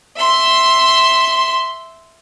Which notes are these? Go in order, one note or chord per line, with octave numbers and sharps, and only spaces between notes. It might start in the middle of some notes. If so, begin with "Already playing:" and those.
E5 C6